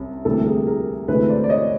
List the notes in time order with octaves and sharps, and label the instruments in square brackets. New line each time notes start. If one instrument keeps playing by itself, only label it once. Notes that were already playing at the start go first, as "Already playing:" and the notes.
Already playing: [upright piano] C2 C3 C#4
D2 C3 E3 G3 A#3 A4
G#4 A#4
G#4 A#4
D2 C3 E3 G#3 A4 B4
C5 D5
D5
C#5 D#5